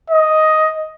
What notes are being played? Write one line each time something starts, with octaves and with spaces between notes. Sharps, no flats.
D#5